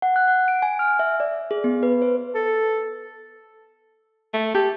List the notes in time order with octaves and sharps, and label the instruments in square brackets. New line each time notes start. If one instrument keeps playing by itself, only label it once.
[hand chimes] F#5
F#6
F#5
D7
G#5
F6
E5
D5
G#4
B3
B4
C5
[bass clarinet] A4
[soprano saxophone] A3
[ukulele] G4 [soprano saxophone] A4